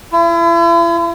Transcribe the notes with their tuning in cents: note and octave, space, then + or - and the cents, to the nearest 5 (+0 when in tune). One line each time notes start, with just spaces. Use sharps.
E4 +40